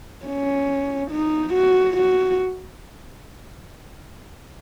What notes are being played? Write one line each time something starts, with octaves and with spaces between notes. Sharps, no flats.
C#4
D#4
F#4
F#4